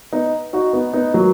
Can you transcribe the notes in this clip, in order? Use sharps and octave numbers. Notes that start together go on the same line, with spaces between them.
B3 D#4
D#4 F#4
B3 D#4
B3 D#4
F#3 A#3